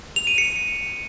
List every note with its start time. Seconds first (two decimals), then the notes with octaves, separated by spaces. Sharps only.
0.16 F7
0.27 D#7
0.38 C#7